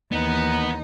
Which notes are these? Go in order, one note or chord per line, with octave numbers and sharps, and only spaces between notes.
D#2 E3 B3 D#4